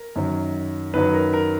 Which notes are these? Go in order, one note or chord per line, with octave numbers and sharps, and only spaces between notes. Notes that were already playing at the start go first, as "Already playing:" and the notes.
Already playing: A#4
F#2 D#3 F#3
F#2 D#3 F#3 B4
A#4
A#4